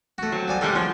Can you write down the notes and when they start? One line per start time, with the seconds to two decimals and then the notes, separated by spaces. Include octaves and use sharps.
0.18 A3 F#4
0.32 F#3 C4
0.48 F3 G3 G#5
0.61 C3 G3 G#3 A4 F5 F#5
0.75 F3 C#4